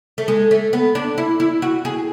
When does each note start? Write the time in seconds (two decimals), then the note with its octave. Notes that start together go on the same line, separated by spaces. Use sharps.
0.18 A3
0.28 G#3
0.51 A3
0.73 B3
0.95 D4
1.18 E4
1.40 E4
1.62 F#4
1.85 G#4